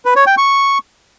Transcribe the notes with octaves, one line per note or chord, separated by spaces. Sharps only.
B4
C#5
G5
C#6